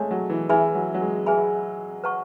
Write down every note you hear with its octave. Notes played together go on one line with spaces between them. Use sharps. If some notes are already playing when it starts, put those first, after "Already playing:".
Already playing: G#3 A3 C#4 C#5 G#5
F#3
E3
E3 G#4 B4 E5 G#5 B5
F#3
F#3
G#3
G#4 B4 E5 G#5 B5
B4 F#5 A5 C#6